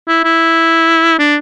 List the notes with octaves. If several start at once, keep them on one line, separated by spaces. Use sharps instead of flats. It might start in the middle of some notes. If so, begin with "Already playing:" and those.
E4
E4
D4